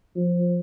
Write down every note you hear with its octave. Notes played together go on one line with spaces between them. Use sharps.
F3